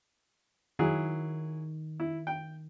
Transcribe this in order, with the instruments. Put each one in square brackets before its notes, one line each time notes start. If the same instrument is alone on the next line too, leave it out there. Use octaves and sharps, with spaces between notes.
[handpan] D#3 [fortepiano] F#3 E4 G#4
[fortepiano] E4
G5